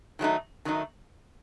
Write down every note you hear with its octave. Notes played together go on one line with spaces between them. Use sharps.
D#3 F#3 A3 D#4
D#3 F#3 A3 D#4